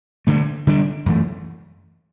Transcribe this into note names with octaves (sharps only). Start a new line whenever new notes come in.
G2 D3 A3
D3 G3 D4
F#2 E3 A3